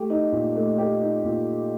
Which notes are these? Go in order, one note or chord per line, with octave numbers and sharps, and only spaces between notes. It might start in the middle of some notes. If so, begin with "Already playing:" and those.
Already playing: A3 G4
D#4
A#2
A3
G4
D#4
A#2